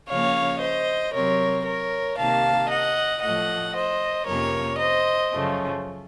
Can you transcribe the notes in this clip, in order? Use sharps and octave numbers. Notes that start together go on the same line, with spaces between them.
C#3 F3 A#3 C#4 C#5 F5
C5 D#5
C3 F#3 C4 A#4 C#5
A#4 C#5
C3 D#3 A#3 F5 A5
D#5 F#5
A2 F3 A3 D#5 F#5
C5 D#5
F2 C3 F3 A#3 C#4 A#4 C#5
C5 D#5
F#2 C#3 F3 A3 C#4